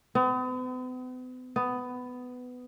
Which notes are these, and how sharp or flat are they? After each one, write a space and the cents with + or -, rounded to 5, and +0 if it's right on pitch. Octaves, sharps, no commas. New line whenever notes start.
B3 +45
B3 +15